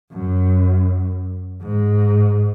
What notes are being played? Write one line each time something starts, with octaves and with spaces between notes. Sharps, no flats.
F#2
G#2